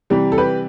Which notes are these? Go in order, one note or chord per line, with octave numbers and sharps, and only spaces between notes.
C3 E3 G3
A4
G4 B4